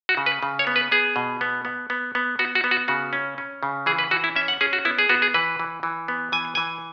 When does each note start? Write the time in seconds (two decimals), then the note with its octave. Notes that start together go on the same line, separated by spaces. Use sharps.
0.09 F#4
0.17 C#3
0.26 B4
0.43 C#3
0.59 C#5
0.67 B3
0.76 B4
0.92 B3 G#4
1.16 B2
1.41 B3
1.65 B3
1.90 B3
2.15 B3
2.39 B3 F#4
2.55 F#4
2.64 B3
2.71 F#4
2.88 C#3 F#4
3.13 C#4
3.38 C#4
3.63 C#3
3.86 E3 G#4
3.98 B4
4.11 E3 F#4
4.24 E4
4.36 C#4 E5
4.48 F#5
4.61 C#4 G#4
4.73 F#4
4.85 B3 E4
4.99 G#4
5.09 B3 F#4
5.22 G#4
5.34 E3 B4
5.59 E3
5.83 E3
6.08 B3
6.32 E3 G#5
6.55 E3 G#5